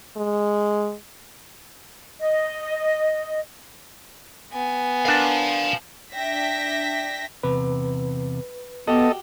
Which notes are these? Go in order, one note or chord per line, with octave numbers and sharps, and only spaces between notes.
G#3
D#5
B3 G#5
D4 A#4 F5 A5
D4 E5 G5 A#6 B6
E2 C3 B4
B3 F#4 G4 A4 D#5